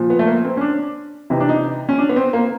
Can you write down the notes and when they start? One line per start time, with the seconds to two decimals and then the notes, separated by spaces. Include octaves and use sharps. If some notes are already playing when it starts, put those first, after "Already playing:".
Already playing: A#2 F3
0.10 B3
0.19 A3
0.27 A#3
0.45 C4
0.57 C#4
0.61 D4
1.30 C3 E3 D#4
1.40 D4
1.49 D#4
1.89 C#4
1.98 D4
2.09 B3
2.16 C4
2.33 A#3